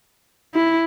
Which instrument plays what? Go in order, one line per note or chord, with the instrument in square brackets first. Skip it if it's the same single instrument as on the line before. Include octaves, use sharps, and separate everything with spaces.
[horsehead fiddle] E4